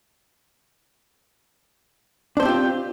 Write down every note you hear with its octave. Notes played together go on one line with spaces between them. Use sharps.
C4 D4 F4 G4 C5